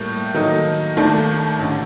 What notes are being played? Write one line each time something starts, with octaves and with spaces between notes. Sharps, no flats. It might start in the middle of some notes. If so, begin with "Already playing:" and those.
Already playing: A2 G3 A#3
D#3 F#3 A#3 D#4 A4
D#2 D#3 A3 D4
A1 D3